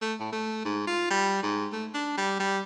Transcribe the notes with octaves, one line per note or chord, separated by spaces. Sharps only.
A3
A2
A3
G#2
F4
G3
G#2
A3
D4
G3
G3